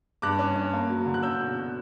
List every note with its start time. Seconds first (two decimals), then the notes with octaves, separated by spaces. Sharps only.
0.22 G2 D6 F#6
0.39 C#4
0.56 C#4
0.73 A#3
0.90 F#3
1.06 D3
1.14 F#6
1.23 C#4 E6 G6
1.40 B2
1.57 B2